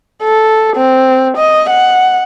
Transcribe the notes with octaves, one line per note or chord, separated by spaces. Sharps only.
A4
C4
D#5
F#5